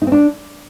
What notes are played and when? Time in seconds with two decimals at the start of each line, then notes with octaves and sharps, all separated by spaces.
0.02 D#4
0.07 C4
0.12 D4